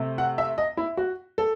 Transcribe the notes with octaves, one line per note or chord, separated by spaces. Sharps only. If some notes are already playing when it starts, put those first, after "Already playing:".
Already playing: C3 A3
F#5
E5
D#5
E4
F#4
A4